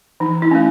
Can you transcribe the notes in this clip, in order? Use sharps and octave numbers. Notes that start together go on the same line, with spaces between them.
E3 D#4
E4
A3 C#4